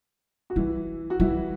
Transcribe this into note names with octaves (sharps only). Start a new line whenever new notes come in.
F#4
E3 G3 E4
F#4
E3 G3 E4